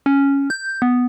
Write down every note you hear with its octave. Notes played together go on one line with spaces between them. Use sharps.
C#4
G6
B3